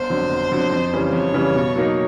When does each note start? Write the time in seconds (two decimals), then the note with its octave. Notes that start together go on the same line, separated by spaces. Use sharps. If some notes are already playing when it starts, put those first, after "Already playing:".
Already playing: G1 C5
0.10 F2 D3 F#3
0.30 G1
0.51 F2 D3 F#3
0.72 F2
0.93 C#3 E3 G3
1.13 F2 C#5
1.34 C#3 E3 G3
1.55 B2
1.76 F#3 A#3 D#4